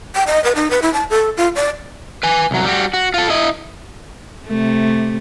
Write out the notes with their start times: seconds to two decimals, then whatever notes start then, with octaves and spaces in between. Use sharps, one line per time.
0.15 G5
0.27 D#5
0.44 B4
0.55 D#4
0.70 B4
0.82 E4
0.94 A5
1.10 A4
1.37 F4
1.56 D5
2.23 B4 G#5
2.51 C2 F#3
2.65 G3 F#4
2.94 F#4
3.14 F4 A4
3.30 E4 D#5
4.47 C3 A3